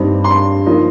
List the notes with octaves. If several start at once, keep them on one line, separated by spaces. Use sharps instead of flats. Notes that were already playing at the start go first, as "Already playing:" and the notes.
Already playing: G2 G3 C4 D#4
C6
F3 A#3 D#4